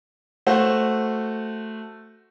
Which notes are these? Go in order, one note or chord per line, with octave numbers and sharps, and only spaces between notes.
A3 F#4 C5